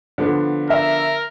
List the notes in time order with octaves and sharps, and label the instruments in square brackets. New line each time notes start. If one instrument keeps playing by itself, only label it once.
[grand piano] D3 F3 B3
[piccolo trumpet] A#4 [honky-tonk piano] E5